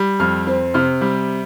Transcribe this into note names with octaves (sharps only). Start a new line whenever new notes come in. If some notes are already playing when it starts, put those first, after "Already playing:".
Already playing: G3
F2 F6
C4
C3 F6
G3